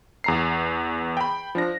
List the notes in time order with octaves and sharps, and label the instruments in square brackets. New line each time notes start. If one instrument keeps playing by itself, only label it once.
[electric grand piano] E2 A#5 C7
G5 B5
F3 D4 A#6